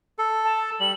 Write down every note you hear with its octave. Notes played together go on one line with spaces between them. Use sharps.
A4
A5
G3 F#7